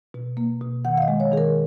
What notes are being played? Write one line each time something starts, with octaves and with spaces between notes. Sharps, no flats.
B2
A#3
B2
D#3 F#5
F5
D#5
G#3
C#5
D#3 G#4
A#4